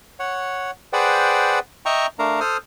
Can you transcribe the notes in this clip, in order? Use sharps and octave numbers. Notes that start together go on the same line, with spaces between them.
C#5 F#5
G#4 B4 C5 D5 F#5 G5
D#5 E5 G5 A#5 C#6
A3 D4 A#4 F5 A#5
A4 C5 D#6 F6